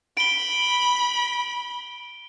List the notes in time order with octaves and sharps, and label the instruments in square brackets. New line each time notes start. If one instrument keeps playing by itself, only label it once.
[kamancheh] B5 [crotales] D7 G7